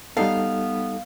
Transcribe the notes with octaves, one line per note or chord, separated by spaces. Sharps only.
G3 B3 D#4 A4 F5